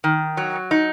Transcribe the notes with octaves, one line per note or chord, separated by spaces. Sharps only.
D#3
F#3
D#4